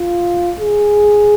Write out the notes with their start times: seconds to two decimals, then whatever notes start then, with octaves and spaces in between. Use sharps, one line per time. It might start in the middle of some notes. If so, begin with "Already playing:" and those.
Already playing: F4
0.59 G#4